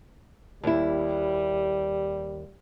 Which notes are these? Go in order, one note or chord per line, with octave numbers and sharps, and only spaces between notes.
D#2 G3 E4